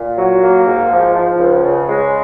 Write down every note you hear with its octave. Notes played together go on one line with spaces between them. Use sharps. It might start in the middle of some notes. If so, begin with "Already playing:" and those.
Already playing: A#2
F#3
A#3
G#2
F3
F3
C#2
C#3
G#3